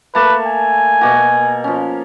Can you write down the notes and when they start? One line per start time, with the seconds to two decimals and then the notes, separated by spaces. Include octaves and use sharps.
0.15 A3 A#3 B4 A5
0.46 G#5
1.01 B2 A#3 F#4
1.64 F3 C#4